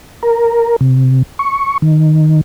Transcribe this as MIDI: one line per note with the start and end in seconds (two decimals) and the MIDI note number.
0.23 0.76 70
0.81 1.23 48
1.39 1.78 85
1.82 2.41 51